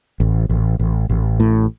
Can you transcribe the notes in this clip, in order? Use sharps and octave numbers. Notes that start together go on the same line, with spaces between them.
A1
A1
A1
A1
A2